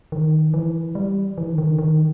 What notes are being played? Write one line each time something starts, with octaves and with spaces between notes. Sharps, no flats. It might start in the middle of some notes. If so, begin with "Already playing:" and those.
D#3
E3
G3
E3
D#3
D#3
D3
D#3